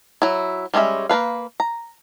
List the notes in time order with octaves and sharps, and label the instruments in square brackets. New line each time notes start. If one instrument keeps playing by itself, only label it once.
[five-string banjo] F#3 E4
G3 G#3 C#4 G#4 E5
A#3 D#4 B4 F5
A#5